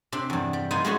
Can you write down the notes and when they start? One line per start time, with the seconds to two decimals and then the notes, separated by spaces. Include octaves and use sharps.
0.12 C3 D4
0.30 E2 G2
0.53 G3
0.71 B3 D#4 F4 C5 F#5 G#5
0.84 G#3 A3 C#4 F#4